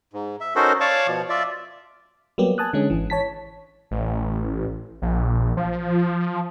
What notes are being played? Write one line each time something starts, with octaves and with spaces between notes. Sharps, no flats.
G#2
E5
C#4 D#4 F#4 A4 A#4 C5
C#5 D5 F5 A5 C#6 D6
B2 F3
F4 D5 E5
F#3 G3 A#3 B3 G4
G#5 A5 D#6 F#6
D3 G#3 C#4
G#1 E3
C#5 A5 B6
A1
A#1
F3